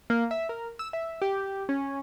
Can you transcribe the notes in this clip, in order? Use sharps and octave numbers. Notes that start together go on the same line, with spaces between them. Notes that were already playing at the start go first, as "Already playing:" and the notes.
A#3
E5
A#4
E6
E5
G4
C#4